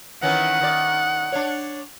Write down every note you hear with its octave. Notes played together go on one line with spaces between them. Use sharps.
D#3 E3 C#4 F#5
D#3 D5
D4 C#5